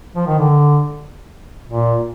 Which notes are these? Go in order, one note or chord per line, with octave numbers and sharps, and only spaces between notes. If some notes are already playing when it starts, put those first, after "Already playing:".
F3
D#3
D3
A#2